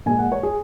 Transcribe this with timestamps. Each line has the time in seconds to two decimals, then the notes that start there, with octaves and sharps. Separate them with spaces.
0.06 A#2 G#3 G#5
0.19 F#5
0.32 C#5
0.43 G#4